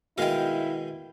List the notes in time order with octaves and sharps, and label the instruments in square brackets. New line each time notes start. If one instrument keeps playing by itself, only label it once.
[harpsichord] B2 D#3 G#3 [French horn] E4 [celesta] F#4 [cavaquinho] F5 G5